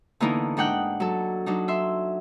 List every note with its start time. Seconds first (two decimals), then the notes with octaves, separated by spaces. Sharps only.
0.20 D3 E3 A#3 B3 D#4 E4
0.57 G#2 D4 D#4 F#5 G5 F#6
1.00 F#3 A4
1.46 F#3 D4 D#4
1.68 E5 C6